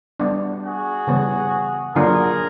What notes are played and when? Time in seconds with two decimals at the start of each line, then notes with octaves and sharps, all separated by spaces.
0.20 G3 B3 D4
0.64 F#4 G#4
1.07 C#3 E3 G3 B3
1.95 D3 F#3 A#3 D4 F4 G#4 A#4